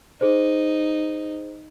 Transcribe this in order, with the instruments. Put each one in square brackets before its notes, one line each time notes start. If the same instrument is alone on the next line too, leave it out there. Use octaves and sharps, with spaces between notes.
[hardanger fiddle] D#4 [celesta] G#4 C5